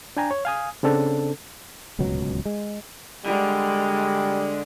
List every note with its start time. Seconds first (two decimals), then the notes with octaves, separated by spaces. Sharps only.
0.17 D4 G5 G#5 A#5
0.31 C#5
0.45 F5 G#5 D#6
0.83 C#3 C4 D4 A4
1.99 D1 C#2 B2 F#3
2.45 G#3
3.26 D3 G3 G#3